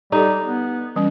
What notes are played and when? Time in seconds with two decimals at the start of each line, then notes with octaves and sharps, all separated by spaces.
0.12 G3 D#4 G4 A4
0.43 B3
0.96 E3 G3 C#4